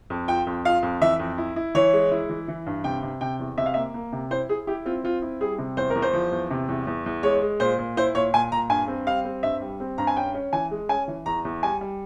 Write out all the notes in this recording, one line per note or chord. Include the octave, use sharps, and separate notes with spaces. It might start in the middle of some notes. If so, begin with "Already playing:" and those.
F2
F4 G5
F2
F4 F5
F2
E3 E5
F2
E4
E4
E3 C#5
G#3
E4
E3
E3
G2
C3 G5
C3
C3 G5
E2
C3 E5
F5
A#3 E5
A#3
C3
E4 C5
E4 G#4
E4 G4
C4 F4
C4 F4
E4
G3 G#4
C3
E2 C5
A#4
E2
C5
F3
E2
C3
E2
E2
E2
G#3 C#5
G#3
A#2 C5
A#2
E4 C5
A#2 C#5
A#2 G#5
A#2 A#5
G2 G#5
C4
G3 F5
C4
G2 E5
G3
C4
G2 A#5
G#5
C#4 G5
C#4
E3 G#5
G#3
C#4 G#5
E3
E2 A#5
E2
G3 G#5
G3